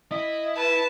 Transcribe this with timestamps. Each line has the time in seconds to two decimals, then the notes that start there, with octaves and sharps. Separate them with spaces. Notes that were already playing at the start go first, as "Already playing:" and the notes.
0.12 E4 D#5
0.57 B4 A5